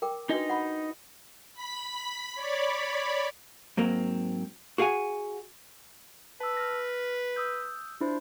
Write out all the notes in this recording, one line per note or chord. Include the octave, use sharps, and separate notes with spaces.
A#4 G5 D6
D4 D#4 F#4 B4 D#5
F#5 B5
B5 B6
C#5 D5 B5
G#2 F#3 A#3 C4
F#4 G#4 F5 F#5 G#5
B4 A5 E6
F6 A#6
D#6 E6 G6
D4 E4 F4 C5